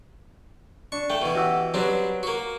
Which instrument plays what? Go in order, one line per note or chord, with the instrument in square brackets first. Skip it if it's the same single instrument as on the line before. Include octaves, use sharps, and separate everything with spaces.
[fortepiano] D4 [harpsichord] C#6
[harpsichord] A3 [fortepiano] G5
[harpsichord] B2 E3
[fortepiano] F#4 G4 E6
[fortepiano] F#3 B4 [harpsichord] G3 C4 D4
[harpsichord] A#3 F#4